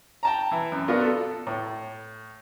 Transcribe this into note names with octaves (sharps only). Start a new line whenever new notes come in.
G5 A5 A#5
E3
F#2
B3 D4 F4 F#4 A#4
A4
A2